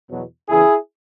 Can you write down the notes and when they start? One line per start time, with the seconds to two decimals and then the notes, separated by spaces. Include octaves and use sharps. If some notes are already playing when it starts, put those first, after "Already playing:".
0.08 E2 B2 F#3
0.48 E2 C#3 E3 E4 G#4